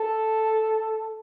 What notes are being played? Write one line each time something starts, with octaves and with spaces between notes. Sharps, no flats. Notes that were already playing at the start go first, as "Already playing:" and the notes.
Already playing: A4